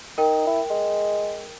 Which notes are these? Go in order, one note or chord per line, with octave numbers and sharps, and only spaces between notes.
D#4 A#4 G5
E4
G#3